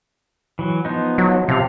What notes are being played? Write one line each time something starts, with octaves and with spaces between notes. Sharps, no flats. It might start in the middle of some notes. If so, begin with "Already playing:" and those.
E3 F#3
F3 B3 D#4
F#3
C3 F3 F5